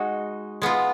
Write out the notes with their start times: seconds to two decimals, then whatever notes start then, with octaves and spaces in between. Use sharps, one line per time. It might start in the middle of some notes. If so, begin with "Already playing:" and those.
Already playing: G#3 D#4 F#4
0.62 G#3 B3 F4